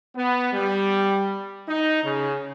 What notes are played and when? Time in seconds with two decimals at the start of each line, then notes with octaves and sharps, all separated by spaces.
0.16 B3
0.53 G3
1.69 D#4
2.04 C#3